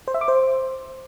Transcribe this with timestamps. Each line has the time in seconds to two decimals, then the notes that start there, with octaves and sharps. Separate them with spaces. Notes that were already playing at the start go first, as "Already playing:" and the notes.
0.08 C5
0.14 E5
0.21 D6
0.28 C5